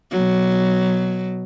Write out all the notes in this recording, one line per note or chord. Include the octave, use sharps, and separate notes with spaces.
B2 F#3